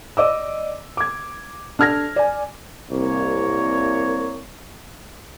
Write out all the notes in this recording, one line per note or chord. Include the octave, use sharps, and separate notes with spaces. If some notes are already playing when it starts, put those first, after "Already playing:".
D5 D#5 D6 E6
D6 G#6
D4 A4 F6 G#6 A#6
D5 G#5
C2 A#3 C#5